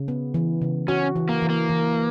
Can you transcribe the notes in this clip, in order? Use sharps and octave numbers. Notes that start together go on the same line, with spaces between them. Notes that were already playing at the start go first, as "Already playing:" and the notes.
Already playing: C#3
B3
E3
C#3
C#4 F#4
E3
A#3
E3
A#3
E3